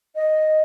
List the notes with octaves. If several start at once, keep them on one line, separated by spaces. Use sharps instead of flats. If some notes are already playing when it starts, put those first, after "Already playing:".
D#5